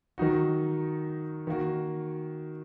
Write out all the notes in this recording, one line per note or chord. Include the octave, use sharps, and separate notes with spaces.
D#3 F#3 D#4 F#4
D#3 A#3 F#4